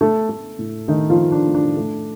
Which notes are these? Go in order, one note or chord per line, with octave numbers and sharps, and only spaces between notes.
A3 A4
A3
A2
D#3 A3 D#4
F3 F4
A3
D4
A2
D4
A3